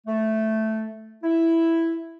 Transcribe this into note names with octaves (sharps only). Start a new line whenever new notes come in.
A3
E4